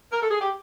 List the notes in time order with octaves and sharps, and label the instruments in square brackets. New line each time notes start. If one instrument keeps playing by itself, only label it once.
[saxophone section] A#4
A4
G#4
G4